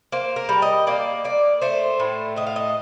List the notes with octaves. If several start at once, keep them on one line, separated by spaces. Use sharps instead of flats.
A#3 C5
A#4
G3
D#5
A#3 D5
A#3 D5
A3 C5
A2
A3 D#5
F5
D#5